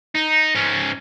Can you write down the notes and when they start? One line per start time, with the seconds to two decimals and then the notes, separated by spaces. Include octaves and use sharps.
0.15 D#4
0.55 G#2 C#4